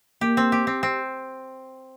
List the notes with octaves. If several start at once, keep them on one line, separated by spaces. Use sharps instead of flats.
A#3 G4
C4
G4
C4
C4